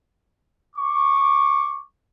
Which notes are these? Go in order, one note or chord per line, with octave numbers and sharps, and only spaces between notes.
C#6 D6